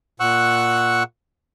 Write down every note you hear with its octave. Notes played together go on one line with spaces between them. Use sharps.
A#2 F#5 C#6 E6 F#6